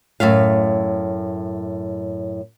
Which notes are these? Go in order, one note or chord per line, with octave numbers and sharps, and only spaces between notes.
F#2 A2 E5 F5